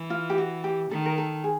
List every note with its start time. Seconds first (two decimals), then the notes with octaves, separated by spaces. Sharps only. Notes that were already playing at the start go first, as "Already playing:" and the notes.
Already playing: E3
0.10 F4
0.30 G4
0.38 F#4
0.64 G4
0.90 D#3 A4
1.06 A#4
1.18 A4
1.44 G#4